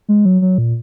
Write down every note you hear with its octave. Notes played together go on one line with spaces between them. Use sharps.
G#3
F#3
F#3
A#2